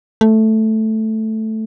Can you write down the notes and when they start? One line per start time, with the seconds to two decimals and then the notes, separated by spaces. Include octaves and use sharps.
0.21 A3